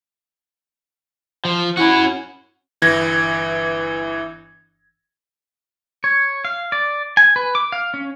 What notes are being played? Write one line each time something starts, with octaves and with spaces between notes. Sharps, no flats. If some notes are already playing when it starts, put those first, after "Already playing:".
F3
C#4 E4 F#4
G1 E3 G#6 A#6
C#5
F5
D5
G#5
B4
D6
F5
C#4